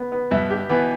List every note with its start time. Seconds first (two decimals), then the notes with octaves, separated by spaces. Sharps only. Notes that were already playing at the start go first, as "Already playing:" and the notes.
Already playing: B3
0.12 B3
0.31 G2 B2 E5
0.50 G4
0.69 B2 E3 B3